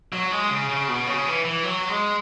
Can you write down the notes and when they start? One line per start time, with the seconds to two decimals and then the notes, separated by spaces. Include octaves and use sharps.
0.13 F#3
0.31 G#3
0.50 C#3
0.69 C#3
0.88 B2
1.07 C#3
1.26 E3
1.45 E3
1.63 F#3
1.88 G#3